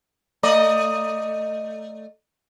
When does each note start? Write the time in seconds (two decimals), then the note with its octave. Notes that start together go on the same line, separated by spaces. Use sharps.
0.43 A3 D5 D#5